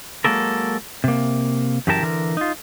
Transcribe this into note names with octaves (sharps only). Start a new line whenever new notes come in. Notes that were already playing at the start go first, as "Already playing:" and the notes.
F#3 G#3 A#3 A4 A#4
C3 A#3
F#2 C#3 E3 G4 A#4 A5
D3 E3 A#4
D#4 F4